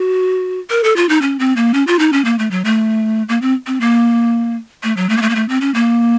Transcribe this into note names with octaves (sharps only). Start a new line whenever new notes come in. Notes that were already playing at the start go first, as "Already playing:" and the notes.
Already playing: F#4
A#4
A4
F4
D#4
C#4
C4
A#3
C#4
F4
D#4
C#4
A#3
A3
F#3
A3
A#3
C4
C4
A#3
A3
F#3
A3
A#3
A3
A#3
A3
C4
C#4
A#3